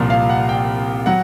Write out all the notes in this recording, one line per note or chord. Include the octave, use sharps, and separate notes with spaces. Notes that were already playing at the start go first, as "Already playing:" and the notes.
Already playing: C2 A#2 F3
F5
F#5
G5
F#3 F#5